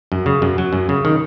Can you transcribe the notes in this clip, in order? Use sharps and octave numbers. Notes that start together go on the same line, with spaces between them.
F#2
C#3
F#2
F#3
F#2
C#3
D#3